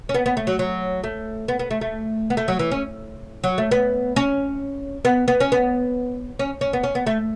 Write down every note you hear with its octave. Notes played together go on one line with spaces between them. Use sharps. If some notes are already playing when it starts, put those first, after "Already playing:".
C#4
B3
B3
A3
F#3
F#3
A3
B3
B3
A3
A3
B3
A3
F#3
E3
C#4
F#3
A3
B3
C#4
B3
B3
C#4
B3
C#4
C#4
B3
C#4
B3
A3